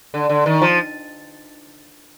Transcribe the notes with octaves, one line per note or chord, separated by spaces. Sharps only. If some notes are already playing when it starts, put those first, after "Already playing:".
D3
D3
D#3
F3